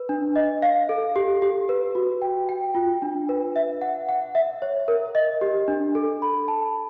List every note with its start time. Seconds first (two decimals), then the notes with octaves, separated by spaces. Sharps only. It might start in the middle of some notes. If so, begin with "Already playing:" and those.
Already playing: B4
0.09 D4
0.36 D#5
0.62 F5
0.89 A4
1.16 G4
1.42 G4
1.69 B4
1.95 F#4
2.22 G5
2.49 G5
2.75 F4
3.02 D4
3.29 B4
3.56 E5
3.82 F#5
4.09 F#5
4.35 E5
4.62 C#5
4.88 A#4
5.15 D#5
5.41 G4
5.68 D4
5.95 A4
6.22 B5
6.48 A5